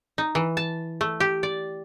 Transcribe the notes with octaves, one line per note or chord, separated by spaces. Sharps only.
D#4
E3
A5
A3
G4
D5